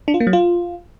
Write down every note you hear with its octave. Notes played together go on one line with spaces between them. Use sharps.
D4
F4
A#3
F#3
F4